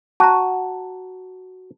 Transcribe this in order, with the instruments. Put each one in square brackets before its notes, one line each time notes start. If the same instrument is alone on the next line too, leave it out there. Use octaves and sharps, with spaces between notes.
[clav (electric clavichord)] F#4 [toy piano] A5 A#5